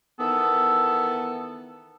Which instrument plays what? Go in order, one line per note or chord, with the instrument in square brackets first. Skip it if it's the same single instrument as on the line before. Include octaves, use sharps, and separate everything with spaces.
[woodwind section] D#3 E3 B3 A4